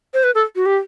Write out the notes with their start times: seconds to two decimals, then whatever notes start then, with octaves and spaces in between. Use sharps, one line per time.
0.14 C5
0.24 B4
0.35 A4
0.56 F#4
0.66 G4